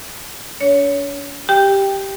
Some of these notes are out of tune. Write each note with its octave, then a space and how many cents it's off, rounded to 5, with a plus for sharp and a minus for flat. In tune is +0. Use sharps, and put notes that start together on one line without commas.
D4 -45 C#5 +20
G4 +0 G5 +10